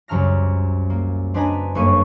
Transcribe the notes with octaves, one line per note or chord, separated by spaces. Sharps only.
C2 F#2 C#3 A#5 F6 A#6
A#3
C4 D4 B4 D#5 G#5 A#5
G1 F#2 A#3 B4 C#6 D#7